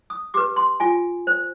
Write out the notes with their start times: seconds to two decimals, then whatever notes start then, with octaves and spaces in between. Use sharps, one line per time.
0.10 D#6
0.34 G4 B4 D6
0.56 C6
0.80 F4 G#5
1.27 C5